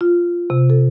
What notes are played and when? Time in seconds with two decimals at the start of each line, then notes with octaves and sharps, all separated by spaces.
0.01 F4
0.50 C3
0.70 A4